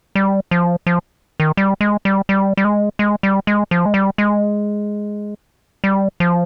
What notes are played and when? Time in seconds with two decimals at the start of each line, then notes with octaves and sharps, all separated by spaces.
0.15 G3
0.51 F3
0.87 F3
1.40 D#3
1.57 G3
1.81 G#3
2.05 G3
2.29 G3
2.57 G3
2.64 G#3
2.99 G#3
3.23 G3
3.47 G#3
3.71 F3
3.86 G#3
3.94 G3
4.18 G#3
5.84 G3
6.20 F3